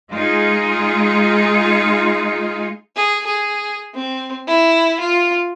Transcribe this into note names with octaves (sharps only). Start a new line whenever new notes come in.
G#3 D#4 F4 G#4
G#4
G#4
C4
E4
F4